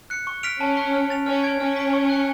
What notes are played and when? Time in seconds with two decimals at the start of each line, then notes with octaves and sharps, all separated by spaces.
0.10 F#6 C#7
0.27 C#6
0.43 F6 B6 D7 F7
0.61 C#4 A5
0.77 C#6 F#6 B6
0.93 F6
1.10 A6 F7
1.26 C#4 F6
1.44 G#6 D7
1.59 C#4 F6
1.76 B6 D7
1.93 C#6
2.10 F#6 C#7